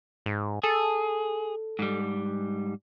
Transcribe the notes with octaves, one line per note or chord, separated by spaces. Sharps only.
G#2
G#4 A4
G#2 G3